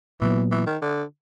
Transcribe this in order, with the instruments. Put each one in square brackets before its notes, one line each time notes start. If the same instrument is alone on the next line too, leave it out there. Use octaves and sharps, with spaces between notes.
[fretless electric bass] A#2 F#3 B3 [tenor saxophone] E3
[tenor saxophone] E3
D#3
D3